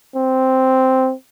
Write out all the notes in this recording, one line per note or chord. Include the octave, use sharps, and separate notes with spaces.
C4